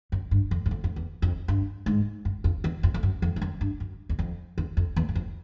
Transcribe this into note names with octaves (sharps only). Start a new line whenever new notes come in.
F#2
G2
F2
F#2
F2
F2
E2
F2
G2
G#2
F#2
F2
E2
F2
F2
F#2
F2
F2
F#2
G2
F#2
E2
F2
E2
F2
E2
F#2
F2